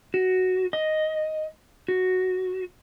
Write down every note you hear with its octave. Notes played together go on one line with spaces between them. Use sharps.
F#4
D#5
F#4